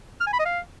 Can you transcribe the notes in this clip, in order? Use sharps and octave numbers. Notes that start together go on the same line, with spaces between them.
F6
G#5
B5
D#5
F5